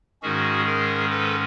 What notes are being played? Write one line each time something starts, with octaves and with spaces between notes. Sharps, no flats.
G#2 D#3 G#3 C#4 F#4 G#4
G#4 A#4
A4 B4